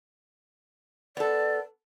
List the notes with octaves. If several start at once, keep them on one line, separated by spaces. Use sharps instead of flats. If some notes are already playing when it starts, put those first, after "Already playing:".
B3 A4 D5